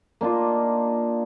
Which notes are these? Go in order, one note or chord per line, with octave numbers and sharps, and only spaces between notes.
A#3 D4 D#4 F4